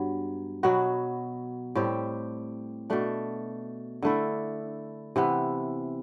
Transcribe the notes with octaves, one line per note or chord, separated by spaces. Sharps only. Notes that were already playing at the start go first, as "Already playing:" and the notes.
Already playing: G2 F#3 B3
B2 F#3 B3 F#4
A2 G3 C4 G4
B2 A3 D4
D3 A3 E4
C3 E3 B3